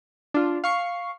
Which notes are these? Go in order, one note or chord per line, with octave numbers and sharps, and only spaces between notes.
D4 F4
F5 C#6 C7